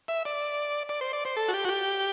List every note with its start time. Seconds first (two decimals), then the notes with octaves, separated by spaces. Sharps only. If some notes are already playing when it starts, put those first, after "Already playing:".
0.08 E5
0.25 D5
0.89 D5
1.01 C5
1.13 D5
1.25 C5
1.36 A4
1.48 F#4
1.54 G4
1.65 F#4
1.69 G4